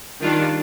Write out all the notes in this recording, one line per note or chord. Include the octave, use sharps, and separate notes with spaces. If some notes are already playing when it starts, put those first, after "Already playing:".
D#3 G3 D4 F4